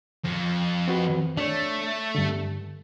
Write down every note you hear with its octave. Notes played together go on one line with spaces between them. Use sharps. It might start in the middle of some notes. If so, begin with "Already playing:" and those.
F2
C4 F#4 B4
A3 D4 C#5
G2 D3